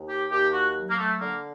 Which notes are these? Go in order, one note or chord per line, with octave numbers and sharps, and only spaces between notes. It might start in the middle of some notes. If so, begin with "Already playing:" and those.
Already playing: D#2
G4
D#2 G4
F#4
F#3
A#3
A3
D3 A#3